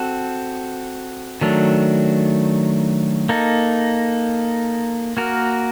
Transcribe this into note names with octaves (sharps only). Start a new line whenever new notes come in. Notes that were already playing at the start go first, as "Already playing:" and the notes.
Already playing: C4 F#4 A4
D#3 F#3 A3 D4
A#3 D#4 A4
A#3 F#4 A#4